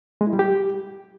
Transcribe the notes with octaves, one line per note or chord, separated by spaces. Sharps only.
G#3
E4
G3
G4